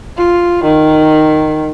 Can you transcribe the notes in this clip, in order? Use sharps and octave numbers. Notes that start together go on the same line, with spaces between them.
F4
D#3